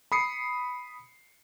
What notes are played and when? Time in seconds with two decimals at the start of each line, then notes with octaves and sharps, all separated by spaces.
0.12 B5 D#6 C7 C#7